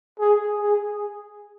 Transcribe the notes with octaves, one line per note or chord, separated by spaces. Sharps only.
G#4
G#4